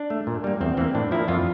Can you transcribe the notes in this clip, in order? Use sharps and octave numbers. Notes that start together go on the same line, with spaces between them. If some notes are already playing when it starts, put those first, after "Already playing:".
Already playing: D4
A3
A#2
G3 A#3
E2 C4
E3 A#3 C4
A2 D4
F3 A#3 E4
F2 F4